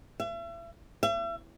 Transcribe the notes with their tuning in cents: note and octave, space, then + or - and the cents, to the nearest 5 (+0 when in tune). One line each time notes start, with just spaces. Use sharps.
E5 +40
E5 +40